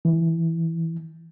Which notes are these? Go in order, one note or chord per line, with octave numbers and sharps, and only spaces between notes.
E3